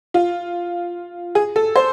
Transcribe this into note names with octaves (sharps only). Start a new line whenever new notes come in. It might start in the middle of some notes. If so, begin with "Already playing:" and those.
F4
G#4
A4
C5